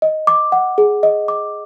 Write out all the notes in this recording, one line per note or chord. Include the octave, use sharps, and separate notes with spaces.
D#5
D6
F#5
G#4
D#5
D6